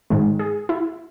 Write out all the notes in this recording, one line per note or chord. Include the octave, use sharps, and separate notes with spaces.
G#2 D#3 G#3
G#4
E4